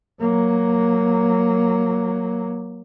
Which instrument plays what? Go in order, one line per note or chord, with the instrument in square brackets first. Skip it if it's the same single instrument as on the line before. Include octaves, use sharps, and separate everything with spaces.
[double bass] F#3 A#3